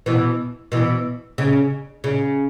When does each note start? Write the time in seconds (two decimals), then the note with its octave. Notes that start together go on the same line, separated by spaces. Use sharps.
0.06 B2 E3
0.72 B2 E3
1.38 C#3
2.04 C#3